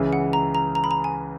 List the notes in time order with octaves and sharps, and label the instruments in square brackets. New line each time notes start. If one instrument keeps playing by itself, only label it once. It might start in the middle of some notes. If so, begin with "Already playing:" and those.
Already playing: [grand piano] C#2 C#3 E3
[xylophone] F#5
A#5
A#5
A#5
B5
A#5
G#5